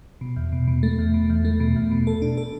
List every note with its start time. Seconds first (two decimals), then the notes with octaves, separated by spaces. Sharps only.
0.21 B2
0.36 E2
0.52 B2
0.68 B2
0.83 A3
0.99 E2
1.14 B2
1.30 E2
1.45 A3
1.60 B2
1.76 E2
1.91 B2
2.07 A4
2.22 D4
2.37 A4